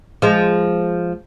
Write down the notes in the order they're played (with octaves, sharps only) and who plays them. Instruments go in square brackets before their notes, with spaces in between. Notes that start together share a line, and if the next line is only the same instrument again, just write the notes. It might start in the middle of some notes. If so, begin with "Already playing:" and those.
[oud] F3 G#3